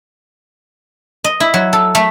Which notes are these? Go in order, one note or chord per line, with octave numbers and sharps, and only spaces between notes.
D#5
E4
F#3
A4
A3